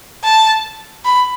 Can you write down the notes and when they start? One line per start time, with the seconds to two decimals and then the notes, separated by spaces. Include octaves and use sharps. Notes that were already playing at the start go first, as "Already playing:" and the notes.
0.24 A5
1.05 B5